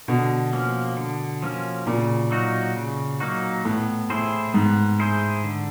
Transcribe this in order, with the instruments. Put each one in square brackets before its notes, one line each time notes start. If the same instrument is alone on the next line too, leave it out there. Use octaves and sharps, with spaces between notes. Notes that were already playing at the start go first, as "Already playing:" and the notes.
[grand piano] B2 [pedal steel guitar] D3
[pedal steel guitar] F3 A#3 C#4
D3
F3 A#3 C#4
[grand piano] A#2 [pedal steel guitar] C#3
[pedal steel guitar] F#3 A#3 D#4 F#4
C#3
F#3 A#3 D#4 F#4
[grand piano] A2 [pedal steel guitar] B3
[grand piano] A2 [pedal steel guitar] E4 G#4 C5
[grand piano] G#2 [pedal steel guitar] B3
[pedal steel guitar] E4 G#4 C5
D3